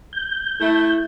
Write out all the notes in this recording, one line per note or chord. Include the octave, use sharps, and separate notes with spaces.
G6
A3 E4